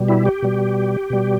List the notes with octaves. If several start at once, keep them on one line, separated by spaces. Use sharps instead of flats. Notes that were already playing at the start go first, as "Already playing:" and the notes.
Already playing: B2 G3
E4
G4
B2 G3
B2 G3